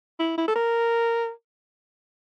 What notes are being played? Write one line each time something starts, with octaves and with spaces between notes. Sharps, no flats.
E4
E4
A4
A#4